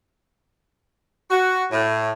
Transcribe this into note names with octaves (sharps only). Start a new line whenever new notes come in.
F#4
A2